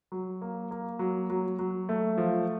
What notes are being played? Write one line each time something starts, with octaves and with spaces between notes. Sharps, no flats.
F#3
A#3
A#3
F#3
F#3
F#3
A3
F3